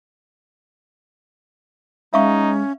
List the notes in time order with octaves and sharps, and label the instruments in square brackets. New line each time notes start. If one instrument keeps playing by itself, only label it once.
[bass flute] G#3 [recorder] C#4 [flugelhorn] D#4 [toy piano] E5 F5 C#6